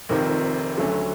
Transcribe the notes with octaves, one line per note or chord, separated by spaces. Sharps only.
F1 F2 C3 D#3
D2 D3 F#3 A3 C#4